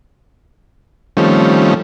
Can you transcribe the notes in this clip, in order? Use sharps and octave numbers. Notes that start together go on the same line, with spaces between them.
D#3 F3 G3 A3 C4 C#4